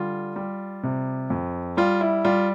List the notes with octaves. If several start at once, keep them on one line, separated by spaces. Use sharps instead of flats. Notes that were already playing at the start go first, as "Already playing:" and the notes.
Already playing: D3 G3 F4
G3
C3
F2
G3 F4
E4
G3 F4